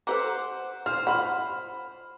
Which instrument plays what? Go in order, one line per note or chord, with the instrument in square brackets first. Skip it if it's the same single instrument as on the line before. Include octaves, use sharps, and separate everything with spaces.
[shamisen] A4 B4 A#5 [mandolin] C5 F#5 D6
[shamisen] F3 [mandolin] C5 [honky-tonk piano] F6
[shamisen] F4 F5 F#5 [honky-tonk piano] B5